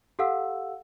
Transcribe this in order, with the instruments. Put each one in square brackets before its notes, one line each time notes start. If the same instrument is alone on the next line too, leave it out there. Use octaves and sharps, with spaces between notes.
[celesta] G4 A4 F5 F#5 E6